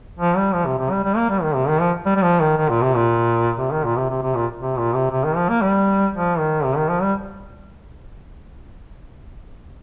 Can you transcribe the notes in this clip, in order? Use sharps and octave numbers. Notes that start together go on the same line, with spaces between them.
F3
G3
F3
C3
C3
G3
G3
A#3
G3
D#3
C3
D#3
F3
G3
G3
F3
D#3
D#3
A#2
C3
A#2
C3
D#3
A#2
C3
C3
C3
A#2
C3
A#2
C3
C3
D#3
F3
A#3
G3
F3
D#3
C3
D#3
F3
G3